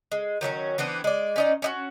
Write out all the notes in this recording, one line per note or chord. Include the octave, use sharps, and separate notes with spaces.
G#3
D#3 F#3 A3 C#4
E3 B3 C4 D4
G#3 D5
C#4 D#4 D5
C#4 D#4 F#4